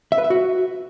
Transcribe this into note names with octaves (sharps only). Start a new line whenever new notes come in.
E5
B4
E5
F#4